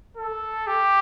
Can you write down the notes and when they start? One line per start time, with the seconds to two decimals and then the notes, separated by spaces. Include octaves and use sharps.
0.17 A4
0.67 G4